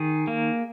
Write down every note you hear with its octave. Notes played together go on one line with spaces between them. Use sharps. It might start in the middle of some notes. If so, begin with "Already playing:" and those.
Already playing: D#3 G#4
A#3